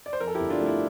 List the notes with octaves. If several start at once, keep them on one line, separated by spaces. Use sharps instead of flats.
D5
C5
F2 A#4
A4
E4 G4
G1
D4 F4
A3
E4